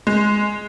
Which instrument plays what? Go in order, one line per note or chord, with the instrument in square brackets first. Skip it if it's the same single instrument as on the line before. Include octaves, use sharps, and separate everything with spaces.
[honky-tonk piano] G#3